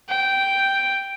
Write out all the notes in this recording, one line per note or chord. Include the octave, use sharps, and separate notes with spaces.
G5